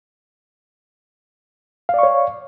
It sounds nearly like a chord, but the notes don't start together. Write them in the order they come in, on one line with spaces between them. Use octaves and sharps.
F5 D5 C#6 C#5